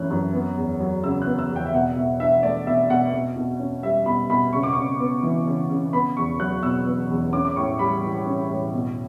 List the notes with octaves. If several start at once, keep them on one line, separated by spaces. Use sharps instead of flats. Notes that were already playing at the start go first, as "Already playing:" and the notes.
Already playing: F#2 E3 A3 C#4 F#6
F#2
B3
E2
F#3
C#3 E6
F#6
B3
E6
E2
G5
E5
B2 F#5
B2 E5
D4 E5
A3 D5
B2 E5
B2 F#5
B2
B2
C#4
G3 E5
B2 B5
B2 B5
C#3 C#6
D6
C#3 C#6
B3
E3
C#3
C#3
B3 B5
E2 C#6
F#3 F#6
B2 E6
B3
E2
C#4 D6
D6
A2 C#6
G3 B5
E3
C#4
A2
B2